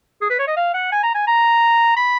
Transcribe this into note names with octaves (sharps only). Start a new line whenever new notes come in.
G#4
B4
C#5
D#5
F5
F#5
G#5
A#5
G#5
A#5
B5